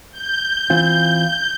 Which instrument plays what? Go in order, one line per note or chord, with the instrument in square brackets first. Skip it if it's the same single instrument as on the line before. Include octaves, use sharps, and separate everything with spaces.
[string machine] G6
[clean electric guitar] E3 C4 F4